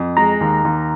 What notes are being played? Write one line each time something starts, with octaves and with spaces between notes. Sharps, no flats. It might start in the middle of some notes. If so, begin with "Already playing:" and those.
Already playing: F2
G#3 A#5
D#2
D#2